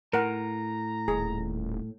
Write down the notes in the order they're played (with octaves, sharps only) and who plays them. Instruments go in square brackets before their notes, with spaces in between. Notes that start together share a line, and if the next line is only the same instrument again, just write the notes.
[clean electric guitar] A2 [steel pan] A#4 F#5 [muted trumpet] A#5
[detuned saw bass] D#1 [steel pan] G#4